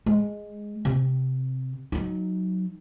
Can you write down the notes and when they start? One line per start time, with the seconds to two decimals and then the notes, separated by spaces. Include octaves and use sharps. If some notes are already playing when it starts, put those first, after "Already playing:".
0.06 G#3
0.85 C3 C4
1.92 F#3 D#4